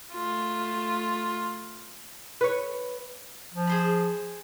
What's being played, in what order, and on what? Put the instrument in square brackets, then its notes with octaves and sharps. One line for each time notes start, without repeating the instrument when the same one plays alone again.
[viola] A3 F4
[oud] B4 C#5
[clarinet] F3
[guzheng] G#4 C5 B5